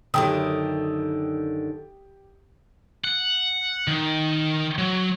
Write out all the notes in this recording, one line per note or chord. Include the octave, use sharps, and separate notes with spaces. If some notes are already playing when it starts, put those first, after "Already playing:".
F#2 D3 D#3 G4 G5 D#6
F#5
D#3
F#3